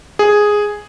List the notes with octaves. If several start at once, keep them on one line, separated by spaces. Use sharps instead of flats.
G#4